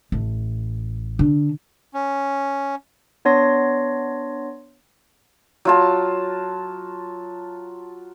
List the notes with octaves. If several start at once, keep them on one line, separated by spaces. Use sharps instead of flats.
A1
D3
C#4
B3 D4 C#5 C6 A#6
F#3 F4 A5